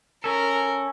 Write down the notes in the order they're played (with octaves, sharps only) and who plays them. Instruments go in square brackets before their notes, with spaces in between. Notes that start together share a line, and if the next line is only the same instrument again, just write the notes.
[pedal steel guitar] C#4 A4 [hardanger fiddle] A#4